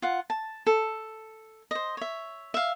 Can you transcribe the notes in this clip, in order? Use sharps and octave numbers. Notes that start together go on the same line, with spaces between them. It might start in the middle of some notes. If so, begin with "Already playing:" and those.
F4 F#5
A5
A4
C5 D#5
C#5 E5
E5 F5